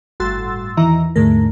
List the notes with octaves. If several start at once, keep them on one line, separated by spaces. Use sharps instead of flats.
G1 A2 F#4 C6 E6 A6
E2 D#3 E3 E4 A#5
D#2 G#2 D3 A3 A#4